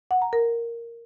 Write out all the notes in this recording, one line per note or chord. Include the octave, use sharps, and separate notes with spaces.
F#5
A#5
A#4